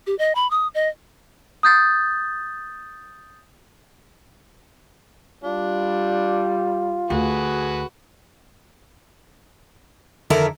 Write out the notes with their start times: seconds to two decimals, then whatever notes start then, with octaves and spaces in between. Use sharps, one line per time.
0.07 G4
0.19 D#5
0.35 B5
0.51 D#6
0.75 D#5
1.63 D#6 G6 A6
5.44 G3 D4 F4
7.10 D2 F#4 G#4 B4
10.30 F2 D3 D#3 E4 A4 A#4